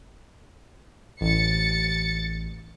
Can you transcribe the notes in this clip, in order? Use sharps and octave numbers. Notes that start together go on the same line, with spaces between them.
A1 A6 C#7